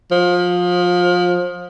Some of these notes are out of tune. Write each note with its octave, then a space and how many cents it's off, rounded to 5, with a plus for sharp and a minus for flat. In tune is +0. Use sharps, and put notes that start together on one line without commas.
F3 +25